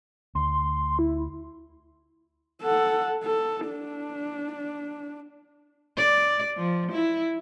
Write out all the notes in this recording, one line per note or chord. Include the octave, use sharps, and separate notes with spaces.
D2 C6
E4
A4 F#5
A4
D4
D5
F3
E4